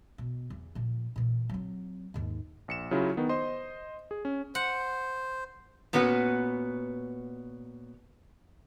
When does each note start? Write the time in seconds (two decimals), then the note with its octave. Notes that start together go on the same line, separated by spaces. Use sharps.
0.18 B2
0.50 E2
0.75 A#2 F3
1.16 A#2 E3
1.49 F#3 C4
2.14 D#2 G#2
2.68 A#1 C#7 E7
2.91 C#3 F#3 E4 F4
3.17 D#3 B3
3.29 C5 D#5 C6
4.11 G#4
4.25 C#4
4.55 C5 F#5
5.93 A#2 B3 C#4 F#4 B4